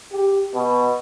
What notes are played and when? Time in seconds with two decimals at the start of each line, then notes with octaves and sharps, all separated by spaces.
0.12 G4
0.54 B2